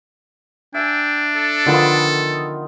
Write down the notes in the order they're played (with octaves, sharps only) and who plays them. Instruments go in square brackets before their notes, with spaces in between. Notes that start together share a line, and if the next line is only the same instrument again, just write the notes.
[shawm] D4 [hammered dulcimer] E5 G#5 [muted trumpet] G5
[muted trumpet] A4
[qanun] D3 F3 B5 [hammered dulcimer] D#3 B3 F4